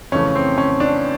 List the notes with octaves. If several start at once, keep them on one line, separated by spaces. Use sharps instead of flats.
F2 C#3 E3 A3 C#4
C4
C#4
D4